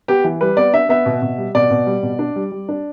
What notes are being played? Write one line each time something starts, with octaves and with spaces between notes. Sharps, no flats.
B3 G4
E3
G3 B4
B3 D5
D4 E5
B3 E5
B2
B2
G3
B2 D5
B2
G3
B2
D4
G3
G3
D4